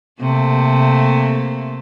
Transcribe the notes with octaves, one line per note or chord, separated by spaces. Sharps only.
C3 A3 A#3